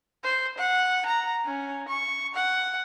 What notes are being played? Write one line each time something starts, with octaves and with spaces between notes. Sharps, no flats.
C5
F#5
A#5
C#4
C#6
F#5